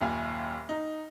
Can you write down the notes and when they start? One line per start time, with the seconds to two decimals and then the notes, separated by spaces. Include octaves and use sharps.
0.01 F#1 D#2 A#2 F4 F5 G#5
0.69 D#4